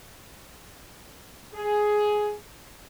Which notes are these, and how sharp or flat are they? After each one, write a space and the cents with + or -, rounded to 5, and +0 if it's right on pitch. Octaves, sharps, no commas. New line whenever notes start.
G#4 +10